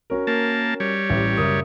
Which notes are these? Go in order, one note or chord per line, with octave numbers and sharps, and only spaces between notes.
C#4 F#4 A#4
A#3 A5
G3 C#5
A1 A2
F#1 A#4 D#6